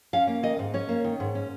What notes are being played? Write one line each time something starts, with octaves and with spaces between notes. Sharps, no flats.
C#4 F5
A#3
D#3 D#5
G#2
C#4 C#5
A#3
D#3
G#2
C#4